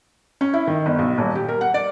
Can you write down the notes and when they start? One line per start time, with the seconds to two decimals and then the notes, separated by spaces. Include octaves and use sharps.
0.41 C#4
0.53 E4
0.67 D#3
0.86 G1
0.99 B1
1.18 D#1
1.35 G4
1.48 A#4
1.61 F#5
1.74 D5